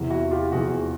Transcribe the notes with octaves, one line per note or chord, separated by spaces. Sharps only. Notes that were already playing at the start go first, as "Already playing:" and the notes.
Already playing: E2 C3 E3
E4 F#4
F4 G4
E2 C3 E3 F#4 G#4